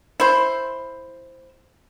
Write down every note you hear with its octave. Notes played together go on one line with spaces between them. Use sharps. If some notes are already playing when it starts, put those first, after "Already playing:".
E4 C5